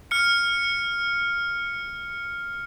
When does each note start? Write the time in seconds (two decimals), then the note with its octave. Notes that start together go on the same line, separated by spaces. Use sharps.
0.11 F6 C#7